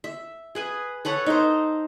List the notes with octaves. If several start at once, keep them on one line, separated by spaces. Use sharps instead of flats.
E5
G#4 B4 G#5
A4 B4 C#5 F#5
D#4 C5